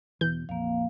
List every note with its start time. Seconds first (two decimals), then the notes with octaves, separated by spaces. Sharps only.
0.21 E2 B2 E3 G6
0.49 A#1 F2 A#3 F5